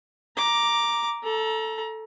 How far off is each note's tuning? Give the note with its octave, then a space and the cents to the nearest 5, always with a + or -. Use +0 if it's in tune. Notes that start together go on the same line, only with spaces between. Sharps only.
A#5 +5 D6 +0
A4 +0 A#5 +30